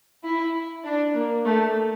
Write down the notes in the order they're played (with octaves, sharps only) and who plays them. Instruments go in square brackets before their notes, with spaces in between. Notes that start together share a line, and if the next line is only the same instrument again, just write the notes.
[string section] E4
D4
A#3
A3